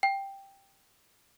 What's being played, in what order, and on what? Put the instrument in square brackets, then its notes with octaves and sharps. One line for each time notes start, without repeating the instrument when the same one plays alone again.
[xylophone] G5